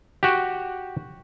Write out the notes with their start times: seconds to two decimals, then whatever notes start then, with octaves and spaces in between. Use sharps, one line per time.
0.23 F#4 G4